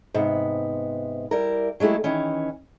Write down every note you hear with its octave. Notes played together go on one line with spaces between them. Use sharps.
G#2 C3 B3
G3 E4 A#4
F#3 G#3 A3 E4 G4
D#3 E3 C#4